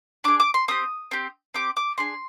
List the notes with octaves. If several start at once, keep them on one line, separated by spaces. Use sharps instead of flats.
D4 G#4 D6
D6
C6
C4 G4 D#6
C4 G4
C4 G4 D6
D6
D4 G#4 C6